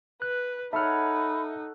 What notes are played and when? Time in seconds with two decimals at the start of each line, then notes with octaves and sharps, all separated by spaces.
0.22 B4 F#6
0.73 D#4 A4 C#5 E5 F#5 B5 F6